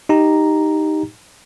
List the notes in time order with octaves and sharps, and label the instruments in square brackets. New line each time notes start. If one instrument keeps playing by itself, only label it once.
[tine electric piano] D#4 G4 A#5